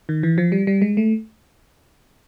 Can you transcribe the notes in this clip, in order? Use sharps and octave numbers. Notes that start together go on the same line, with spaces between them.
D#3
E3
F3
G3
G3
G#3
A3